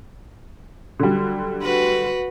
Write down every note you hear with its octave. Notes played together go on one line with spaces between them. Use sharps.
D3 F#3 G3
F#4 B4